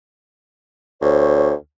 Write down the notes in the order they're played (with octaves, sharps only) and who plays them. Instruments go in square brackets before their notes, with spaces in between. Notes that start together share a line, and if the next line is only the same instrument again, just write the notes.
[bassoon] D2 [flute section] C5 C#5 C#6